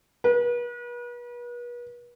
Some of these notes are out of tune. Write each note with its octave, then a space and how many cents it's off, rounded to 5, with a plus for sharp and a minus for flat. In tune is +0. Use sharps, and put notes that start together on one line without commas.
B4 -40